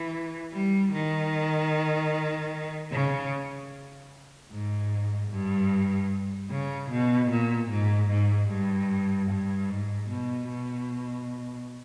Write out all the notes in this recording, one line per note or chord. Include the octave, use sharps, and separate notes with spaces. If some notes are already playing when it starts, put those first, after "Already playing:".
Already playing: E3
G3
D#3
C#3
G#2
G2
C#3
B2
A#2
G#2
G#2
G2
G2
G#2
B2
B2